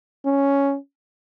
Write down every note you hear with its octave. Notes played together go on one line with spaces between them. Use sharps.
C#4